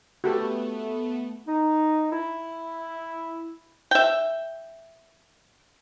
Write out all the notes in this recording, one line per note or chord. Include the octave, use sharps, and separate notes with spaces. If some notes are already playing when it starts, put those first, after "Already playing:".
A3 B3 F#4 G4 A4
D#4
E4
E5 G5